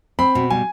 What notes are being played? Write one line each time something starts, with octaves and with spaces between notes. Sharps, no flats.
C4 B5
B2
G3 G#5